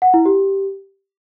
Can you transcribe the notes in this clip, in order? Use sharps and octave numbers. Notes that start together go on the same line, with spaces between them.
F#5
E4
G4